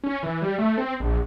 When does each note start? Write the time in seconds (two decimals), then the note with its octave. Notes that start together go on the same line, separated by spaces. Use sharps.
0.04 C#4
0.23 E3
0.42 G3
0.59 A3
0.78 C4
1.00 A#1